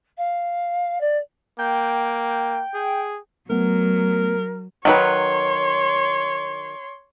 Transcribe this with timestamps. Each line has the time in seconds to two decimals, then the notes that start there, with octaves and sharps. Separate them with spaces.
0.17 F5
1.01 D5
1.59 A#3 G5
2.74 G#4
3.50 F#3 A3 B3 A#4
4.85 D#3 F#3 B4 C#5 C6